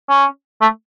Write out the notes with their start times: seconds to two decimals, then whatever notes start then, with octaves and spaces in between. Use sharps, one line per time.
0.09 C#4
0.61 A3